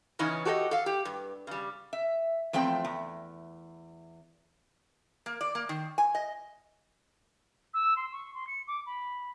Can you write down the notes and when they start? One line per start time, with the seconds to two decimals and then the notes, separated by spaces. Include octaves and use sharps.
0.19 C#3 E3 C#4 D#4
0.45 F#4 G4 A4 D5 D#5
0.71 A4 F5
0.86 G4
1.05 G2
1.47 C#3 G3
1.93 E5
2.53 E2 F3 A3 C4 G5
2.85 E2
5.26 A#3
5.41 D5
5.55 A#3
5.69 D#3
5.98 G#5
6.15 D#5
7.74 E6
7.96 C6
8.12 C#6
8.34 C6
8.47 C#7
8.67 D6
8.86 B5